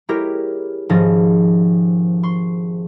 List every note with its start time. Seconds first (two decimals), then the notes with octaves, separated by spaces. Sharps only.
0.09 G#3 E4 G4 A#4 C#5
0.89 G#1 G#2 F3 C#4 D#5 A6
2.23 C6 C#6